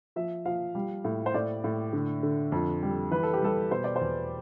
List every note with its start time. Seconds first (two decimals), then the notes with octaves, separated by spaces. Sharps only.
0.16 F3 E5
0.45 F3 F5
0.75 G3
1.05 A2
1.26 C5
1.34 A2 D5
1.64 A2
1.93 D3
2.23 D3
2.52 F2
2.83 G3
3.11 E3 B4
3.23 A4
3.34 G4
3.41 G3 A4
3.71 B2 C5
3.84 D5
3.96 C5
4.01 E2